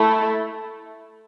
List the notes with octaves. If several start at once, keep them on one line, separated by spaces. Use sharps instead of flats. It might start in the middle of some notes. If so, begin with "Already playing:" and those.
Already playing: A3 E4 A4